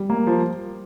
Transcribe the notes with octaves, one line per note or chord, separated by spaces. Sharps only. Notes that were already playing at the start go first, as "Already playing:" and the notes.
Already playing: G3
A#3
F3